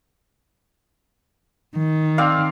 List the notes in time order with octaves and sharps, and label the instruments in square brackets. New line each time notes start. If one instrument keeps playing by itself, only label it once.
[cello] D#3
[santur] C4 D5 F5